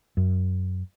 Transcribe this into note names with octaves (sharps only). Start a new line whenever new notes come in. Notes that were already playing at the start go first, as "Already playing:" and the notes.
F#2